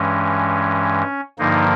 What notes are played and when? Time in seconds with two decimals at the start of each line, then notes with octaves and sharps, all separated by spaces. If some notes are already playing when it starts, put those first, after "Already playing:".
Already playing: G2 E3 G#3 C#4
1.38 G2 D3 F3 A#3 D#4